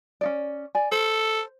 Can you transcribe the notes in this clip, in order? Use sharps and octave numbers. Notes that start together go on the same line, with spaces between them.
C#4 D#4 D5
D5 G#5
A4 C5